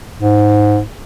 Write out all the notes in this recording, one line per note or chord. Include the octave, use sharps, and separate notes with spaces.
G#2